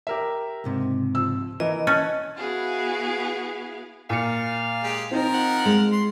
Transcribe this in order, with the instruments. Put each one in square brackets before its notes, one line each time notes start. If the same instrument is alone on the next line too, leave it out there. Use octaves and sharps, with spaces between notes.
[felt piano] G4 A#4 E5
[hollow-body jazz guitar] C#2 G#2 C3
[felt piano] F3 E6
[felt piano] E3 [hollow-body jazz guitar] A#4 [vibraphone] D#5
[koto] C#4 [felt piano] A5 F#6 A6
[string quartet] B3 E4 F#4 G#4 F5
[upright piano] A#2 C#7 [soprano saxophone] F5
[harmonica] G#3 G4
[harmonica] F3 A#4 [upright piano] C4 D#4
[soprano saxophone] F#5
[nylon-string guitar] G#3
[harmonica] C6